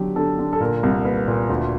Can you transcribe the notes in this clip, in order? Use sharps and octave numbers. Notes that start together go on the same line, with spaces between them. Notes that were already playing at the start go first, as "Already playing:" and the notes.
Already playing: D3 F#3 G4
D3 A4
D3
A4
A#2 A#4
C2
A#3 B4
A#2
D2